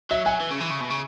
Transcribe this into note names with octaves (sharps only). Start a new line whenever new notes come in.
F#3 E5
F#3 G#5
E3
C#3
E3
C#3
B2
C#3